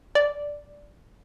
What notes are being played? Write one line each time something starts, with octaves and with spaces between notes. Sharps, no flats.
D5